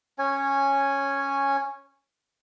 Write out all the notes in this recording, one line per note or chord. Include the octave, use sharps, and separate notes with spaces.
C#4 C#5 G#5